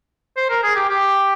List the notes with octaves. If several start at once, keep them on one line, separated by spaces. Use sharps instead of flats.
C5
A#4
G#4
G4
G4